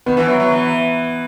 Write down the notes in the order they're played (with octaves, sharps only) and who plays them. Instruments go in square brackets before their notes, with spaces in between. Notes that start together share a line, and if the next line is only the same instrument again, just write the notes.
[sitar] D#3 [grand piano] B3
[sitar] E3
F#3
F#3
E3